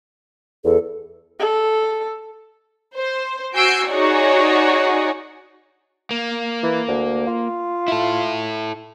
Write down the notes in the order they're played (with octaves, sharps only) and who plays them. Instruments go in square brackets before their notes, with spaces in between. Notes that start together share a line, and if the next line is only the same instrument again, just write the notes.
[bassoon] E2 [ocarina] A4
[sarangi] A4
[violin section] C5
F#4 G#5 E6 G6 C7 D7
D#4 F#4 G#4 C#5 D5 F#5
[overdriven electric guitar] A#3
[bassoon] E3
D2
F4
[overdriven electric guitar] E4 A4